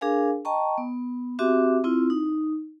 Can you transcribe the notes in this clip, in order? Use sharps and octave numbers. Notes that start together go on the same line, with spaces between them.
D4 G#4 A#4 F5 G#5
D#5 G5 A5 A#5 C#6
B3
C4 F#4 G4 E5 D6
C4 E4 F4
D#4